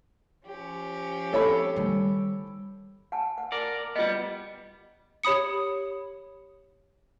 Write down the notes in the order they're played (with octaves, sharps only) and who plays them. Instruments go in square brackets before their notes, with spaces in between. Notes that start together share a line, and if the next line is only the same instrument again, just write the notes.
[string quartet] F3 C#4 G4
[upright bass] C4 [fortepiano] A4 C#5 B5
[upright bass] D#3 G3
[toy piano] F#5 G#5 A5
F#5
[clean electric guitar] A#4 D5
[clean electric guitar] G3 B3 [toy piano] F4 D#5
[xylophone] G4 C#5 B5 D#6 C#7